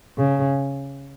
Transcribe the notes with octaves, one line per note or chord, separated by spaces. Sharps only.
C#3